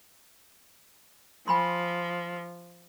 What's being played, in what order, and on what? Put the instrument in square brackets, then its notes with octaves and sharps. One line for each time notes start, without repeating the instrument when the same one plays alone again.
[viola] F3 [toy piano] G#5 B5 C6